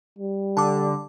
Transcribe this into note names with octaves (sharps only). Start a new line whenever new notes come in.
G3
D3 A5 D6